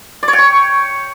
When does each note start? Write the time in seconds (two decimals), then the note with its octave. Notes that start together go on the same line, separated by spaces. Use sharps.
0.23 D5
0.28 C#5
0.33 G5
0.38 C#6